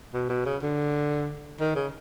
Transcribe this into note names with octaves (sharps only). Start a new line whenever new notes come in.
B2
B2
C#3
D3
D#3
C#3